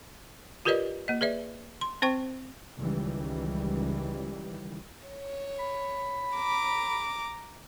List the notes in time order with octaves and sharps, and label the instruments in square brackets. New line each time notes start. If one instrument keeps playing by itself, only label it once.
[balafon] F4 G4 A#4 B4 D5 D#5
A#3 D#5
G#4 B4 D5 E5
C6
C4 C5 G5 C#6
[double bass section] C#2 D#3 E3 G3
[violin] C#5
[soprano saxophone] B5
[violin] A#5 D6